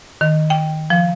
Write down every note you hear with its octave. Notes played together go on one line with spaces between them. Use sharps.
D#3
G5
F3